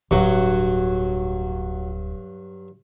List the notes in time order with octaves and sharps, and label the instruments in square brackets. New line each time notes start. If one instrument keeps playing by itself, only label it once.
[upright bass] D1 [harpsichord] G2 F#3 [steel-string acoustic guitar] F#4 C#5